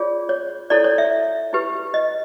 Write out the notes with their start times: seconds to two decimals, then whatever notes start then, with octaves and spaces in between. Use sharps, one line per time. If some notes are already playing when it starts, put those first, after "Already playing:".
Already playing: F4 G#4 C#5 D5
0.29 C#5
0.70 E4 A4 C#5 D5
0.84 C#5
0.98 E5
1.53 E4 G4 B4
1.94 D#5